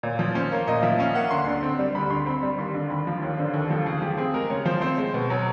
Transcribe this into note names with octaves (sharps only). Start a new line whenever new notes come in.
A#2 C#5
F3
C#4 C5
A#3 C#5
A#2 D#5
F3 E5
C#4 F5
A#3 F#5
D2 C6
D3
C4
G3
D2 B5
D3 C6
C4 B5
G3 B5
D#2 C6
D3
D#2 B5
F3 F5
D#2 C#5
D3 C5
D#2 A4
F3 A4
C#3 G#4
F3 G4
C4 G#4
G#3 A#4
C#3 C#5
F3 C5
C4 C5
G#3 C5
B2
F#3 C#5